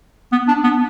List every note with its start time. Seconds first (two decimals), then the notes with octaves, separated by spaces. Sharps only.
0.32 B3
0.48 D4
0.64 B3